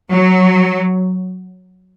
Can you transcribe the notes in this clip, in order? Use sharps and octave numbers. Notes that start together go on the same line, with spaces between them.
F#3